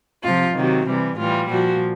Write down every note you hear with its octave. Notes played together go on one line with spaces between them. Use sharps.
C3 F3 F4
C3 D#3 F#3
C3 E3 G3
A2 E3 G3 F4
A#2 F3 F#4